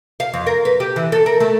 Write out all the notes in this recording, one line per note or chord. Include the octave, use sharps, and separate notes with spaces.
F5
F2
A#4
B4
G4
E3
A4
A#4
A3